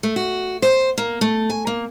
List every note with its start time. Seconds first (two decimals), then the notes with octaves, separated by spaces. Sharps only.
0.03 A3
0.16 F#4
0.62 C5
0.98 A#3
1.21 A3
1.50 G#5
1.67 A#3